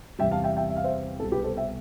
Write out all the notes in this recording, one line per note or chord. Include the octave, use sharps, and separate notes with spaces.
E2 C3 G3 E5 G5
F5 A5
E5 G5
E5 G5
E5
F5
C5 E5
C2 B2 G3 A4
G4 B4
A4 C5
E5 G5